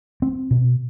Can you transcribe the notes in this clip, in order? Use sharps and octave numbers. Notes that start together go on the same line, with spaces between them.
C4
B2